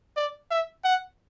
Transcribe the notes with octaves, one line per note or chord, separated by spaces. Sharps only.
D5
E5
F#5